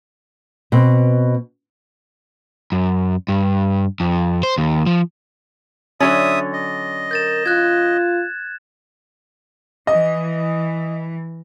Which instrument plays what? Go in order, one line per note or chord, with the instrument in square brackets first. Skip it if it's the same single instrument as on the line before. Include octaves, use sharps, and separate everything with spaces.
[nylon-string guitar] B2 C4
[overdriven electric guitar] F#2
G2
F2
C5
D#2
F3
[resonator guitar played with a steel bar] D3 F#3 C#4 [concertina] E5 D#6 [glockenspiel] A6
[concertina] D#5
[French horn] A#4 [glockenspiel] G6 A6 E7
[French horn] F4 [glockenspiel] F#6 G#6
[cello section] E3 [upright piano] D#5